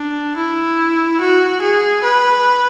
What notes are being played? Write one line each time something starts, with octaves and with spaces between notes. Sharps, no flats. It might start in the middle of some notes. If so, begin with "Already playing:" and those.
Already playing: D4
E4
F#4
G#4
B4